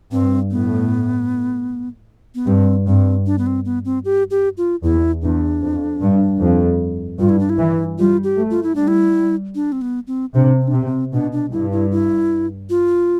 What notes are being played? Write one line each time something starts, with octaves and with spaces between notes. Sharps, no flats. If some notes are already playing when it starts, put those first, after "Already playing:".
G2 C4
A2 B3
B3
G2 C4
G2 C4
D4
B3
C4
B3
C4
G4
G4
F4
E2 E4
E2 D4
F2
G2
F2
G2 F4
E4
D4
E4
E3
G3 F4
G4
A3
F4
E4
G3 D4
E4
D4
C4
B3
C4
C3 D4
C4
D4
C3 C4
C4
B2 D4
D4
G2 E4
E4
E4
F4